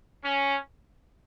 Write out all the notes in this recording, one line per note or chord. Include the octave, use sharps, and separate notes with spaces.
C#4